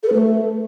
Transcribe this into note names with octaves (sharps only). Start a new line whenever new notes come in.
A4
B4
A3